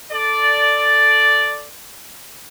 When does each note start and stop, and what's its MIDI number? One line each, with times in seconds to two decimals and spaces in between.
0.12 1.67 69
0.12 1.67 74